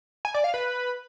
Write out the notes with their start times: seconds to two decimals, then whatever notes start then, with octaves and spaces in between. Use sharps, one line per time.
0.25 G#5
0.34 D5
0.44 F5
0.54 B4